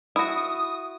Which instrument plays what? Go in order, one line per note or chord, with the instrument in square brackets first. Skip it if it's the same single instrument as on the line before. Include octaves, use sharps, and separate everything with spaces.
[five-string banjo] E4 F#4 [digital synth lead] D#6